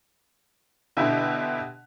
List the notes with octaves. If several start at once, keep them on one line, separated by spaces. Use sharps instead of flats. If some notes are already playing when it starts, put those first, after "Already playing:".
B2 D3 E4 G4